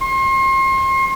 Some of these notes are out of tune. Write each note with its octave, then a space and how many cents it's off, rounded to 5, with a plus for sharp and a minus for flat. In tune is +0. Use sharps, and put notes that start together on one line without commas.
C6 +40